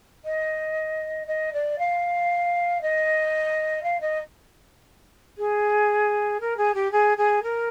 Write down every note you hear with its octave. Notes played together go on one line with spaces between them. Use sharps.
D#5
D#5
D5
F5
D#5
F5
D#5
G#4
A#4
G#4
G4
G#4
G#4
A#4